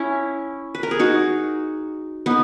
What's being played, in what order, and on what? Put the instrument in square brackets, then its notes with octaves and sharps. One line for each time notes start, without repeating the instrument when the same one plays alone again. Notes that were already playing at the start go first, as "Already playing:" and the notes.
Already playing: [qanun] C#4 E4
B4
A#4
G#4
D#4 F#4
B3 D#4